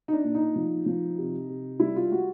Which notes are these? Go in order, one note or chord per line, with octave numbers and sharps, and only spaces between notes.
D#4
D4
A#2
D#4
F3
F3
C3
C3
G3 E4
F4
G3 F#4